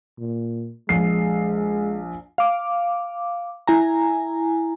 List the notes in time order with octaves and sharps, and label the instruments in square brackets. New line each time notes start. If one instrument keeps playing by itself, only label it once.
[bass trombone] A#2
[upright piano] A#1 C7 [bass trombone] G#3
[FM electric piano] F5 D6
E4 G#5 A#5